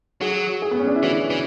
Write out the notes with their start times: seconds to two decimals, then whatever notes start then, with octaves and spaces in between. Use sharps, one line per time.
0.21 F#3 G#4
0.62 G#4
0.71 B3
0.79 C#4
0.87 D4
0.95 E4
1.03 E3 F#4
1.30 E3